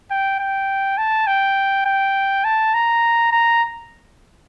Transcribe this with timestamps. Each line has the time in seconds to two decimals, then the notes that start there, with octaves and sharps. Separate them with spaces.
0.11 G5
0.39 G5
0.98 A5
1.27 G5
1.86 G5
2.45 A5
2.74 A#5
3.32 A#5